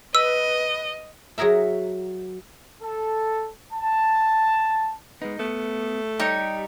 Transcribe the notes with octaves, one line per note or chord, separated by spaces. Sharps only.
B4 D#5 E6
F#3 F#4 G#4 A#4 E5
A4
A5
G#3 B3 D#4
A3 B3
G3 D#4 G4 C#5